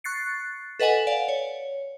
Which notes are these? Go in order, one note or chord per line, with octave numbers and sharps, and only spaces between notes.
C#6 F#6 A6 C7 C#7
A4 B4 D#5 F#5 G#5
D5 F5
C#5